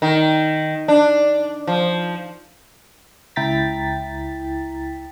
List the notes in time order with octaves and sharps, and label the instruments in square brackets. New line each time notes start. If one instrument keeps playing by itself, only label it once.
[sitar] D#3
D4
F3
[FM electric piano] C#2 E4 G5 A#5 A6 B6